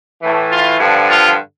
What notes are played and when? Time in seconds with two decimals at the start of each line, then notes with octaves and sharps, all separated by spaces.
0.21 A2 E3
0.50 F4
0.79 G2 D3 F3
1.09 F4